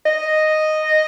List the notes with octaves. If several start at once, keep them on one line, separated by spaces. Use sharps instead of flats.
D#5